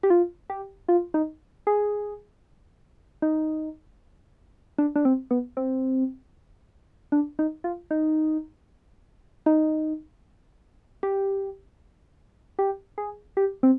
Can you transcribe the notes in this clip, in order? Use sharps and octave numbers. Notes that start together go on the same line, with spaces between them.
G4
F4
G4
F4
D#4
G#4
D#4
D4
D4
C4
B3
C4
D4
D#4
F4
D#4
D#4
G4
G4
G#4
G4
C4